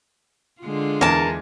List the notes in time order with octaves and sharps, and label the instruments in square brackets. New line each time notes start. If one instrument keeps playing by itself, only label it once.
[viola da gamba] D3 G#3 F4
[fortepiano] E2 [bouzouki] A#4 A5